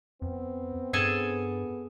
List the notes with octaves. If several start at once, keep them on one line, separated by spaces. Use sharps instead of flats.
F2 B3 C4
G2 G#4 A4 G#5